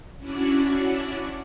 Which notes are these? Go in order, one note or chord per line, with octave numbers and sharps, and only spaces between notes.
C#4 D4 E4 F#4 D5